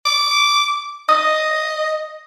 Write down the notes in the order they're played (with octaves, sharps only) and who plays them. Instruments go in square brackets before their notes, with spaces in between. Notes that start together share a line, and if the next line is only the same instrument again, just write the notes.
[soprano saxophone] D6
[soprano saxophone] D#5 [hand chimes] D#6